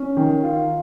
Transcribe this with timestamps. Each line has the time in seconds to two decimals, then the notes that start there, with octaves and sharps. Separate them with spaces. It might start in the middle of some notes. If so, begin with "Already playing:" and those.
Already playing: C#4
0.17 D#3
0.43 F4